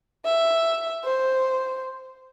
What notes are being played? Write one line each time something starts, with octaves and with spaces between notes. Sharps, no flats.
E5
C5